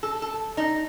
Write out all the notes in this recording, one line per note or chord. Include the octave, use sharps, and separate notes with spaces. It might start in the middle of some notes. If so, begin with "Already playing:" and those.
A4
A4
D#4